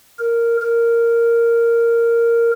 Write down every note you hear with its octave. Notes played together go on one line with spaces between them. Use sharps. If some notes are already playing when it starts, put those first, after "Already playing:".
A#4
A#4